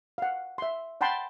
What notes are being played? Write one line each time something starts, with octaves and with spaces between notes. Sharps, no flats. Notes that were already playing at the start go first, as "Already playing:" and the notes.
F5 F#5
E5 C6
F#5 G5 A5 B5 C6